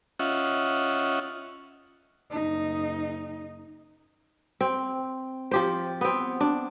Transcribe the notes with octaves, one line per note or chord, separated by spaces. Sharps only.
C#4 F4 D#5 E5 F#5
F#1 D#4
C4
F3 G4 C5
B3 C4
D4